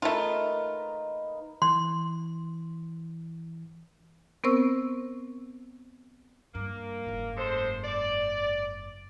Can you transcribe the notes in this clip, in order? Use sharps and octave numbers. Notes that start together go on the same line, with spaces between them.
A3 D#4 F4 A#4 B4
E3 C6
B3 C4 A#4 C5 C#6 E6
G2 A#3
F#1 G#2
G#3 A3 C5
D5